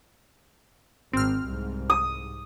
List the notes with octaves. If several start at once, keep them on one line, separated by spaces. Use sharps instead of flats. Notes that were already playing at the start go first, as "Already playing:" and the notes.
G#1 C4 F6
C2 G#2
D#6